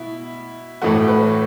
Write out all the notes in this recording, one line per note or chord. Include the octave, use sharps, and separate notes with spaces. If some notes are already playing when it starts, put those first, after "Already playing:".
Already playing: B2 E4
A2 E3 A3 F#4
B4